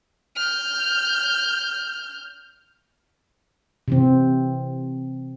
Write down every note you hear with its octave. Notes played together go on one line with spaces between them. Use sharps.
F6 G6
C3 E3 C4